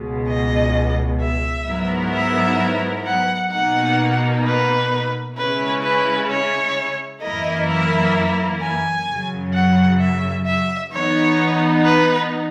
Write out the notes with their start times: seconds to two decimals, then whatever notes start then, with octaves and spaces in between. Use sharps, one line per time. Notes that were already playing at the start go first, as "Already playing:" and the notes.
Already playing: C#2 B2 G#3
0.28 D#5
1.21 E5
1.67 G#2 F#3 B3 E4 A#4
2.13 E5
3.06 F#5
3.51 B2 A#3 D#4 F#5
4.45 B4
5.37 C#3 G#3 C#4 E4 B4
5.83 B4
6.29 C#5
7.22 F#2 E3 A#3 E4 A#4 D#5
7.69 E5
8.61 G#5
9.08 F#2 C#3 F#3
9.54 F#5
10.00 E5
10.46 E5
10.92 E3 B3 D#4 C#5
11.85 B4